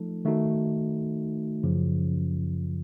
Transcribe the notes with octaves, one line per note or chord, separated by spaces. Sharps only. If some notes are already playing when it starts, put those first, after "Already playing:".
Already playing: F3 A3 D#4 A4
D#3 A3 D#4 F#4
F#2 C#3 F3